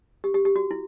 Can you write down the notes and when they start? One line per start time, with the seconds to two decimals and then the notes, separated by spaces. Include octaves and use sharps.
0.24 G4
0.34 G4
0.45 G4
0.56 F#4
0.71 E4